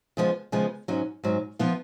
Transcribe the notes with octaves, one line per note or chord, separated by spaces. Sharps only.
C#3 F3 G#3 B3
C#3 F3 G#3 B3
G#2 F#3 C#4
G#2 F#3 C#4
F3 B3 F4